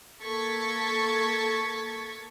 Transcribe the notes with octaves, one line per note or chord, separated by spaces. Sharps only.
A#3 A4 C#6 G#6 A6 B6